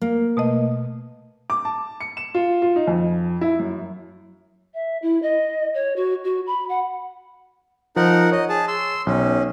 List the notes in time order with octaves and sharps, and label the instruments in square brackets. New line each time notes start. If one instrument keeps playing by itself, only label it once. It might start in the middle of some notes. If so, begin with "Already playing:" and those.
[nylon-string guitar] A#3
[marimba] B2 A3 D#5
[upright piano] D6
A5
C#7
E7
F4
F4
D#4
F2
E4
F#2
[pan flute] E5
E4
D#5
C#5
F#4
F#4
B5
F#5
[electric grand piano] F3 [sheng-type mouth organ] D#4 A#4 F#5
[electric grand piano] C#5 [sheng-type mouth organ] D#5
[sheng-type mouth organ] G#4 A5
C6 E6
[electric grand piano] B1 [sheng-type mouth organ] C#4